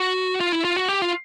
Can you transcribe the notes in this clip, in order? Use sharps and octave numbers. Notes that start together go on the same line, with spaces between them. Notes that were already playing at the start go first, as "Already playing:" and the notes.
Already playing: F#4
F4
E4
F4
F#4
G4
F4